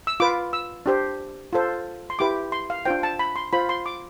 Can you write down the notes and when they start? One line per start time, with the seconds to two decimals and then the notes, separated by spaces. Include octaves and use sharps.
0.07 E6
0.20 F4 B4 D6
0.53 E6
0.86 D4 G4 C5
1.53 F4 A4 C5
2.10 C6
2.19 E4 G4 B4 D6
2.52 C6
2.70 F5
2.85 D4 F4 C5 G5
3.03 A5
3.19 B5
3.36 C6
3.53 F4 C5 B5
3.69 C6
3.86 D6